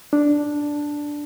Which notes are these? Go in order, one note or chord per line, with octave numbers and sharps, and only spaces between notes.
D4